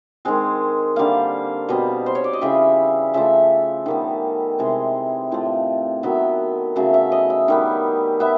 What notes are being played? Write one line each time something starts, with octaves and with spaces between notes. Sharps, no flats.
D#3 G#3 C4
D3 G3 A#3 F5
B2 G3 C4 D#5
C5
C#5
D5
D#5
C#3 E3 G3 E5
C#3 F3 A3 E5
D#3 G3 B3
C3 E3 G#3
A2 F3 A3
D#3 F#3 B3 E5
C#3 F#3 A3 E5
E5
D#5
E5
D#3 G3 B3
B3 E5